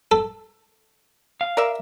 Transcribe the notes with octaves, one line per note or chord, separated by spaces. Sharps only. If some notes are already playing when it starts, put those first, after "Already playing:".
A4
F5
A#4 D5 E5